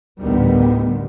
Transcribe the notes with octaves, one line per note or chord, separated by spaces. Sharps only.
A1 D2 D3 D#3 G3 B3